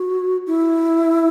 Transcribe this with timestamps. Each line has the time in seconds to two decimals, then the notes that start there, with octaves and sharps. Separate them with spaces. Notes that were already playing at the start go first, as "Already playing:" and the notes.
Already playing: F#4
0.47 E4